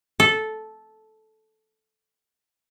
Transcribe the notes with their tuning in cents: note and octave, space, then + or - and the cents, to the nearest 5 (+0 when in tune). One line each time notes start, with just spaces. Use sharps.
A4 -10